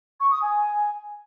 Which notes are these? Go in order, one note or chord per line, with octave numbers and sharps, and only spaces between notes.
C#6
D#6
G#5